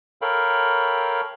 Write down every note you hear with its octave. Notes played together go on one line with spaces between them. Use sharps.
A4 A#4 C#5 F5 G5 B5